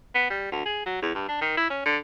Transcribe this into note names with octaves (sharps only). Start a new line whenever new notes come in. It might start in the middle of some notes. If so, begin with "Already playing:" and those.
B3
G3
D2
G#4
F#3
E2
G2
D4
D#3
E4
C#4
D3